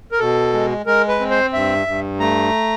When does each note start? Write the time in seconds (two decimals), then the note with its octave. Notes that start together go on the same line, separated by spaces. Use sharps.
0.12 A#4
0.19 B2 A4
0.53 G#3
0.86 G#3 A#4
1.08 B4
1.20 C4
1.31 C5
1.53 G2 E5
1.87 G2
2.20 A3 A#5